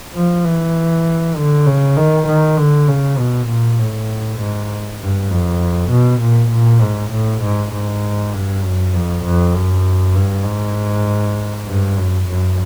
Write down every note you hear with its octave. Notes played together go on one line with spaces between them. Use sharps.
F3
E3
D3
C#3
D#3
D#3
D3
C#3
B2
A#2
A2
G#2
G2
F2
B2
A#2
A#2
G#2
A2
G#2
G#2
G2
F#2
F2
F2
F#2
G2
G#2
G2
F#2
F#2